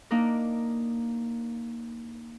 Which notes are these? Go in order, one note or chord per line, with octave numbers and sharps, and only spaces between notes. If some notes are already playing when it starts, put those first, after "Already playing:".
A#3 D4 D#4 A#4